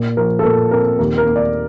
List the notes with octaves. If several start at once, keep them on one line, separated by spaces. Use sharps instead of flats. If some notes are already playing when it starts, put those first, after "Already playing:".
Already playing: A#2
F3 A#4
A4
A#2 A#4
C4 A#4
D#2 A#4
A#4
A#3
D5